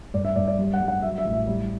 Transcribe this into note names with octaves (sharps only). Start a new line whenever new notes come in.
G2 D5
E5
G2 D5
D5
G3
F#5
G3
F#5
F#3 E5
E5
A1
E5
G3